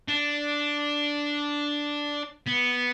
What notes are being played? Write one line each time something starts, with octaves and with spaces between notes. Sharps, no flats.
D4
B3